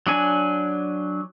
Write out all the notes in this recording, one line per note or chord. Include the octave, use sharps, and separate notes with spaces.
F#3 D4 G#5